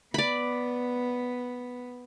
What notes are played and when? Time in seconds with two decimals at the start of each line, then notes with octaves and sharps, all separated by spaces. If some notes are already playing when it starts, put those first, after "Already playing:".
0.14 B3 D5 B5